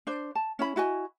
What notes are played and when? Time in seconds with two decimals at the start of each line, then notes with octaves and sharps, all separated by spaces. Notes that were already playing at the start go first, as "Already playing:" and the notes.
0.07 D4 C5
0.35 A5
0.59 C#4 E4 B5
0.76 E4 F#4 D#5 G#5